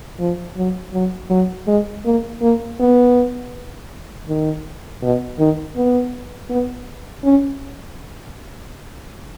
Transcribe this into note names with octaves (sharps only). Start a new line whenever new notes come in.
F3
F#3
F#3
F#3
G#3
A#3
A#3
B3
D#3
B2
D#3
B3
B3
C#4